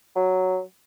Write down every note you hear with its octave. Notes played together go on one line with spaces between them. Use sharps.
F#3